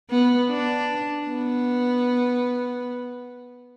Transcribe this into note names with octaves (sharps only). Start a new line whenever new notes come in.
B3
D4
B3